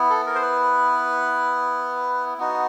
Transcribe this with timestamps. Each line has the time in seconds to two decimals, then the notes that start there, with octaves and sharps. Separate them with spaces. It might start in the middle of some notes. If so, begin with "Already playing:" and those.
Already playing: B3 E4
0.10 A4
0.26 A#4
0.35 C5
0.42 B4
2.38 B3 D#4 F#4